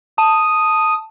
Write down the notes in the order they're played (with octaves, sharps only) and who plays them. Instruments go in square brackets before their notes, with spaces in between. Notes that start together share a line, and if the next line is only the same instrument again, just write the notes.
[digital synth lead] A5 [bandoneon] D#6